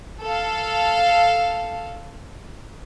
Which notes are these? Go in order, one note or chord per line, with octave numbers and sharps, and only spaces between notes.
A4 F5